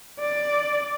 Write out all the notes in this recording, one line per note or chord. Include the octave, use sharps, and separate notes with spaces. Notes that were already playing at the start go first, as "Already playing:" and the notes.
D5